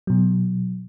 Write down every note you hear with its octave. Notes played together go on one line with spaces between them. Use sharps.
B2 F#3